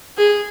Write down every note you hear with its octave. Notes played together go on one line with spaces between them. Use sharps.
G#4